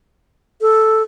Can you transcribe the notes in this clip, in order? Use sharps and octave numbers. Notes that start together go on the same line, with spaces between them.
A4